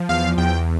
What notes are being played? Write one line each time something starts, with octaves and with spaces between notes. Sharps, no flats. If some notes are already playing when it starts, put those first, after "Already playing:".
Already playing: F3
E2 F5
E2 G5